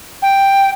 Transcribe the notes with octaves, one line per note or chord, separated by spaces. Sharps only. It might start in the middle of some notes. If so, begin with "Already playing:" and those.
G5